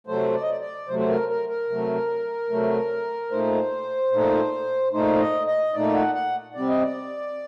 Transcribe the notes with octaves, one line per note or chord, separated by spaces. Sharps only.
C3 F#3 A3 C5
D5
D#5
D5
D5
C3 F#3 A3 C5
C5
A#4
A#4
A#4
C3 F#3 A3
C3 F#3 A3
A#2 A3 D#4 C5
A#2 A3 D#4
A#2 A3 D#4 C5
D#5
D#5
A#2 A3 D#4 D5
F#5
F#5
C3 G3 C4 D5
D#5
D5